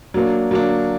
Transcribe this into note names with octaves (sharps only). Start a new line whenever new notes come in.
F#3 A#3 D4
F#3 A#3 D4